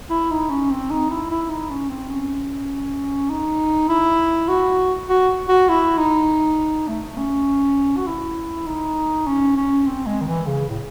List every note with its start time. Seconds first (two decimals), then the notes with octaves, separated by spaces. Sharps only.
0.10 E4
0.31 D#4
0.50 C#4
0.70 C4
0.90 D#4
1.10 E4
1.30 E4
1.49 D#4
1.70 C#4
1.89 C4
2.10 C#4
3.30 D#4
3.88 E4
4.48 F#4
5.09 F#4
5.48 F#4
5.69 E4
5.97 D#4
6.88 A3
7.17 C#4
7.97 F#4
8.07 E4
8.66 D#4
9.27 C#4
9.56 C#4
9.86 C4
10.06 G#3
10.21 D#3
10.27 E3
10.46 C#3
10.69 A2